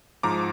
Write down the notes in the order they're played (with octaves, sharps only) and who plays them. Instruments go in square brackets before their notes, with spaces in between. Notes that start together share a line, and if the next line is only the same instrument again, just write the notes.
[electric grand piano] G#2 F3 A#5 D6